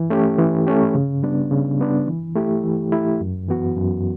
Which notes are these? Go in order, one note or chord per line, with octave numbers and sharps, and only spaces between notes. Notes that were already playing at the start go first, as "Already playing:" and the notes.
Already playing: E3
A3 C#4 G4
E3
A3 C#4 G4
C#3
G3 B3 D4
C#3
G3 B3 D4
E3
A3 E4 G4
E3
A3 E4 G4
F#2
E3 B3 F#4
F#2